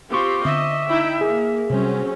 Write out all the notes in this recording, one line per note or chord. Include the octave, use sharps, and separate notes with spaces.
C4 F4 G4 C#6 D6
D3 B3 C4 D#5 E5
D#4 E4 G5
A#3 G#4
C3 F#3 G3 C4 C#4